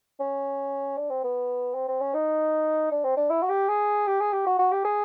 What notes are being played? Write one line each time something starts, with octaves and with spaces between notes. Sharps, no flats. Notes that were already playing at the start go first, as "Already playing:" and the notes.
C#4
D4
C4
B3
C4
C4
C#4
D#4
D4
C4
D4
E4
F#4
G4
G#4
G4
G#4
G4
F#4
F#4
G4
G#4